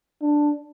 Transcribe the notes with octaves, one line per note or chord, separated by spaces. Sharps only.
D4